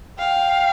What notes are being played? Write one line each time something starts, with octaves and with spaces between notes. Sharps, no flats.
F5 G5